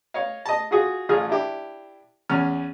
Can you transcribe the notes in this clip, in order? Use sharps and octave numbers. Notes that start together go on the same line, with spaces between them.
C#5 D#5 F5
D#5 A5
F4 F#4 G#4
A1 F4 G#4 F6
D4 E4 G4
E2 C#4 F6